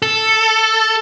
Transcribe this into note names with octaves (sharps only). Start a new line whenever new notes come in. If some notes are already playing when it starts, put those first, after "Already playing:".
A4